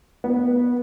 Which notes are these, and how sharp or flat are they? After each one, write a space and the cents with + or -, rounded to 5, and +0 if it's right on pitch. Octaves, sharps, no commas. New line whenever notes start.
B3 -15